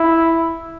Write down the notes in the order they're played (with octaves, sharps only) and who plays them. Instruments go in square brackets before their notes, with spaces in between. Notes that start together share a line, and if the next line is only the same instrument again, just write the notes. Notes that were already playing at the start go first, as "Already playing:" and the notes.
Already playing: [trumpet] E4